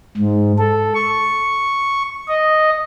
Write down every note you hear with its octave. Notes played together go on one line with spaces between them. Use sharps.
G#2
A4
C#6
D#5